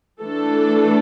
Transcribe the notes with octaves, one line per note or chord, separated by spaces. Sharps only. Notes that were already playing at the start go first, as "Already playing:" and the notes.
E3 A3 D4 A4